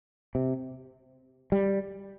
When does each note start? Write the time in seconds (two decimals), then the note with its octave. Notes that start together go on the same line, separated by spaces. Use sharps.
0.35 C3
1.52 G3